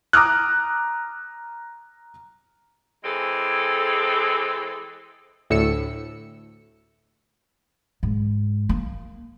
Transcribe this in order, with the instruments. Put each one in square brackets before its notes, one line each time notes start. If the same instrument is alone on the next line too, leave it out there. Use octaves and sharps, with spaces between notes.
[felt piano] A#5 D6 D#6 F6 F#6
[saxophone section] E3 G#3 C4 G#4 A4
[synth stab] D2 A2 E6 C#7
[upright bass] G#2
A#3